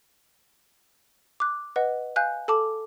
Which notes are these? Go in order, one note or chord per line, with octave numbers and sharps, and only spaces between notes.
D6 F#6
B4 D#5 F#5
F5 G#5 F#6 G6
A4 A5 D6